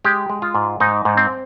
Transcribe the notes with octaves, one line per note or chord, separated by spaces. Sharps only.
G#3 G4
G#3
F4
G#2
G#2 D#4
G#2
C4